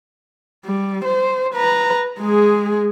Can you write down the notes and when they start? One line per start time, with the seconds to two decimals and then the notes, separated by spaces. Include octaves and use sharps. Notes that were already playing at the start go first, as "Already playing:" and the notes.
0.65 G3
1.05 C5
1.54 B4 A#5
2.20 G#3 G#4